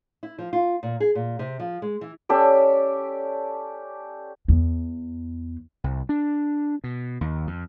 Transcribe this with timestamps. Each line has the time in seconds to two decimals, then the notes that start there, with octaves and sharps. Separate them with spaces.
0.23 E4
0.38 F3
0.53 F4
0.83 A#2
1.00 G#4
1.15 A#2
1.39 C3
1.59 F3
1.82 G#3
2.01 E3
2.29 C#4 G4 A4 D5
4.48 E2
5.84 C2
6.09 D4
6.84 B2
7.21 D#2
7.47 F2